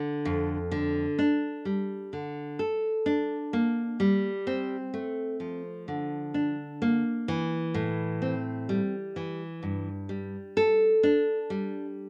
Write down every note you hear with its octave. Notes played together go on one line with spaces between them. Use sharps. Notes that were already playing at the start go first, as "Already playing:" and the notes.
Already playing: D3
F2
D3
D4
G3
D3
A4
D4
A#3
G3
C4
A3
F3
D3
D4
A#3
E3
A2
C4
G3
E3
G2
G3
A4
D4
G3